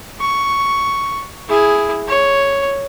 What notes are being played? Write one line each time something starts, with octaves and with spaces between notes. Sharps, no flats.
C#6
E4 G#4
C#5